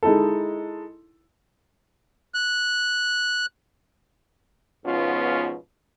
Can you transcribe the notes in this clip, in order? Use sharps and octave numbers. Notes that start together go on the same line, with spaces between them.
G#3 D#4 E4 A4
F#6
G#2 B2 F3 B3 C#4 F4